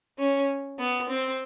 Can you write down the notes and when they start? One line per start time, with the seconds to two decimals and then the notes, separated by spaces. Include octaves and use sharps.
0.19 C#4
0.79 B3
1.09 C4